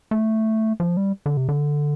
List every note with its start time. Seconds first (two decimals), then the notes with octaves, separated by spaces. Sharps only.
0.11 A3
0.80 F3
0.97 G3
1.26 D3
1.37 C3
1.49 D3